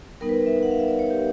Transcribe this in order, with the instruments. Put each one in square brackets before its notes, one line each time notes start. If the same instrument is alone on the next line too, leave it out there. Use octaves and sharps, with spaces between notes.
[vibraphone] G3 B3 D#4 A#4
B4
E5
F#5
F5
E5
D5
C#5
G4